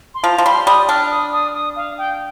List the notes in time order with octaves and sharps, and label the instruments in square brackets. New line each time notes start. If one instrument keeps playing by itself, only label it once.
[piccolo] C6
[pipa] F3 [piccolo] A#5
[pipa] F3
[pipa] G3 [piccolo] C6
[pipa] G3 [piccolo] D#6
[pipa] D4 [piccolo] F6
[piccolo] D#6
D#6
D#6
F5
G5